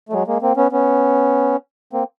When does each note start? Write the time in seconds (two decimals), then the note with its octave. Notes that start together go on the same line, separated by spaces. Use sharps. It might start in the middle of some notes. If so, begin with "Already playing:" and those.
0.09 A3
0.13 F#3 G#3
0.27 G#3 A#3
0.42 A#3 C4
0.57 B3 C#4
0.72 B3 C#4
1.93 A#3 C4